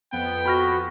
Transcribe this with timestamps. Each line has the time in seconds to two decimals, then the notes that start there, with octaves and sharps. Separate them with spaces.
0.12 F2 B3 G5
0.46 F#4 B5 F6 A#6